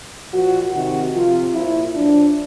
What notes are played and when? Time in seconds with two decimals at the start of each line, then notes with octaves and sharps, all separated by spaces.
0.32 A#2 F3 F#4
0.72 C3 D#3 F#4
1.12 C3 F3 F4
1.54 A#2 F3 E4
1.95 A2 F3 D4